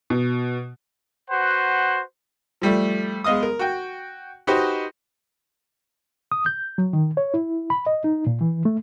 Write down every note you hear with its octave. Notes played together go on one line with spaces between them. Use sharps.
B2
F#4 B4 C5 F#5
F3 G3 A3
G#3 B3 D#5 F5 D#6
A#4
F#4 G5
D#4 F#4 G4 B4 C5 D#5
D#6
G6
F#3
D#3
C#5
E4
B5
D#5
D#4
A#2
E3
A3